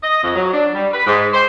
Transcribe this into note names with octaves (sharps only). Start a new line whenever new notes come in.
D#5
F2
F#3
D4
G3
B4
G#2
C5